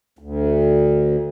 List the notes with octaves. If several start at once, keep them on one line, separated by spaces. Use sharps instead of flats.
D2